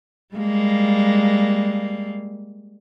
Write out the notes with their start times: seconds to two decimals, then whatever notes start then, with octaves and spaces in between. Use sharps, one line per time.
0.35 G3 G#3 A#3